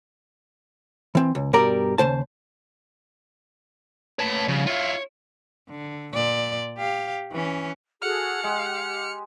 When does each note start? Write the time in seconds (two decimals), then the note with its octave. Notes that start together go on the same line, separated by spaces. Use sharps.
1.15 E3 C4
1.35 C#2
1.53 G2 B2 G3 A#4 D5 A#5
1.98 D#2 C#3 C5 A5
4.19 A3 B4 C#5 A5
4.48 C#3 F3 G3
4.67 E4 F4 C#5
5.69 D3
6.13 A#2 D5
6.78 G4 F5
7.32 E3 C#4
8.02 F#4 G#4 A4 F#5 F6 C#7
8.44 G#3 G4